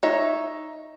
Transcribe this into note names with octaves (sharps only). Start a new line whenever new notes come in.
D#4 C#5 E5